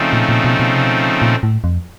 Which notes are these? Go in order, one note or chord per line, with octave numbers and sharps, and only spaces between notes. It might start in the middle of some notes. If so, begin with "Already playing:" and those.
Already playing: C#3 F3 A3 C4 D#4
A#2
A#2
B2
B2
C3
B2
A#2
A2
F2